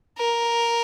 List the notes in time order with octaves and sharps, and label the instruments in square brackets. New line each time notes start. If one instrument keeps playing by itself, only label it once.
[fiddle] A#4